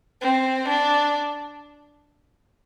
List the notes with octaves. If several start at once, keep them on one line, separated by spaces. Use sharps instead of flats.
C4
D4